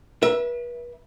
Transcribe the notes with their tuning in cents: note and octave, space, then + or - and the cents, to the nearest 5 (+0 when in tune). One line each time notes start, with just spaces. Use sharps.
B4 -40 E5 +0